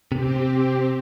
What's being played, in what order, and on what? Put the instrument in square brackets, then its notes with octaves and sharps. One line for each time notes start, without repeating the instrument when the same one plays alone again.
[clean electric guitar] C3 [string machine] C4 G4